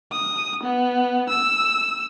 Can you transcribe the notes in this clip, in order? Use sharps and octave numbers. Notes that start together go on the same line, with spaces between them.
D#6
B3
E6